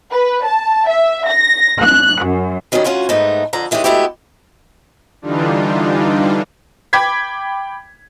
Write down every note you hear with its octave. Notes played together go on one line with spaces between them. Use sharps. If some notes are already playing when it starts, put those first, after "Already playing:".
B4
A5
E5
A#6
F#6
F#2
D#3 F#3 G3 B3 C#4
D2 C#4 F4 F#4 C#5
G#2 A3 B3 D#4
F2 D3 A#5
D#3 E3 G#3 C#4 G4
G#3 A3 B3 E4 F#4 G4
D3 E3 G3 D4 D#4 F4
G5 B5 D6 G#6 B6